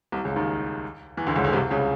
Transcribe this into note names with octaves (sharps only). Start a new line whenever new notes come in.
C2 C3
C#2 C#3
D#2 D#3
E2 E3
D2 D3
C#2 C#3
D2 D3
C2 C3
C#2 C#3